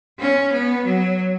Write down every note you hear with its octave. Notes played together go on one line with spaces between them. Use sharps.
C#4
B3
F#3